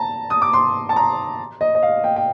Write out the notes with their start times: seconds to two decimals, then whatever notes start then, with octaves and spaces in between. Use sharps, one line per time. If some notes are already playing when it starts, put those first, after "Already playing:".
Already playing: A5 A#5
0.30 D#6
0.42 D6
0.53 C6
0.89 A5
0.96 A#5
1.61 D#5
1.75 D#5
1.83 F5
2.04 G5
2.16 G5